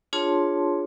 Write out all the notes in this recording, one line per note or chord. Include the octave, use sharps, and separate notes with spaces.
D4 F4 G#4 C#5 A5 C6